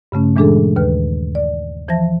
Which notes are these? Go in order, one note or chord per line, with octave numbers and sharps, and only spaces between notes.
G2 C#3 A3 C#4
A#2 E3 G#3 D4 G#4 A4
D#2 D#3 B4 F6
D5
E3 F3 C5 E5 A5 A#6